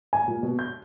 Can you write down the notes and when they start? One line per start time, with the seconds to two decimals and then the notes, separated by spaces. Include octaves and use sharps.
0.13 G#5
0.28 A#2
0.43 B2
0.59 G6